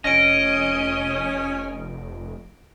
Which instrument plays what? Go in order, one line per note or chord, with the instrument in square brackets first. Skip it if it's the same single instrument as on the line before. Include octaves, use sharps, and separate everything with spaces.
[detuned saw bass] F1 [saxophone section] C#4 [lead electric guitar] D#5 [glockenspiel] A#6 D7